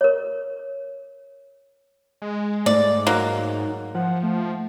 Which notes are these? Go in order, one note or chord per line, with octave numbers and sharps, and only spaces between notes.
A#4 C#5
G#3
G#2 A3 D5
F#3 A#3 D#4
F3 F#5
A3